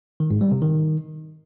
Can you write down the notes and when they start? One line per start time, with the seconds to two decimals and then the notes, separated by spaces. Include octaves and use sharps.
0.20 D#3
0.31 G#2
0.41 G3
0.52 C3
0.62 D#3